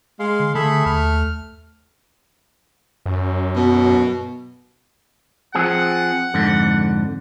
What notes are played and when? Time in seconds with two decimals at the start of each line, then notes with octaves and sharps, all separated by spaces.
0.20 G#3 F5 C6
0.40 D3
0.55 D3 A3 G#4 E5 B5
0.86 D#2 F6
3.06 F#2
3.56 B2
5.55 F3 C4 G#4 F#5
6.34 F2 G#2 D3